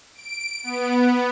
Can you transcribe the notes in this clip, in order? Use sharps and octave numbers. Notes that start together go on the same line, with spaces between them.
D7
B3